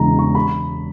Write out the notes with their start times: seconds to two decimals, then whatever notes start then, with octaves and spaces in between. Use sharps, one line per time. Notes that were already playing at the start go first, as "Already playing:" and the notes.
Already playing: E1 E2 C#3 G#3 A#5
0.19 C#6
0.35 B5